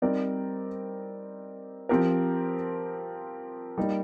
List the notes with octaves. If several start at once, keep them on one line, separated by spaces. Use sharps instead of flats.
G3 C4 D#4 A#4 D5
F3 C4 G4 A#4
G3 A#3 D#4